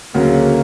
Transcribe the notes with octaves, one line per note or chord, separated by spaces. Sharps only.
D2 C#3 F#3 A#3